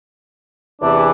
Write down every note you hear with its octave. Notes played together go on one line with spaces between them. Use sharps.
E2 C3 E3 D4